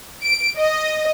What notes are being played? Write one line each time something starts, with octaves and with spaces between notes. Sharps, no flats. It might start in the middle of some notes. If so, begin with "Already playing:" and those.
D7
D#5